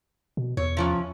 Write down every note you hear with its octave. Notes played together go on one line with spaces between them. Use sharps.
B2
E2 C#5
C3 F3 C#4